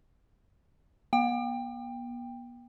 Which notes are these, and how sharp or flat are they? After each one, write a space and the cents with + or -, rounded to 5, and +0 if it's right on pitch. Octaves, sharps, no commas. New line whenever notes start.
B3 -40 G5 +15